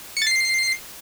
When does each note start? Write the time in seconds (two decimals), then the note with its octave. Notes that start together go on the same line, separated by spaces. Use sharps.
0.17 C#7
0.22 A6
0.27 C7